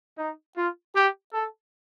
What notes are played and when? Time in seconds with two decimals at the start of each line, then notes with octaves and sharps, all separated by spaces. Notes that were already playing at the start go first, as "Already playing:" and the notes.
0.18 D#4
0.56 F4
0.95 G4
1.33 A4